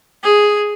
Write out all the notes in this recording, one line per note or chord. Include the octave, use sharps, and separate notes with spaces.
G#4